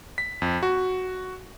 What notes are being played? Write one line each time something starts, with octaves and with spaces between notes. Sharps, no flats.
B6
F2
F#4